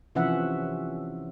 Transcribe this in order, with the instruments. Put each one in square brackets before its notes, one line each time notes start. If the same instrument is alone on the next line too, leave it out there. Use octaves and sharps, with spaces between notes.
[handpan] C3 E3 F3 C#4 E5 F#5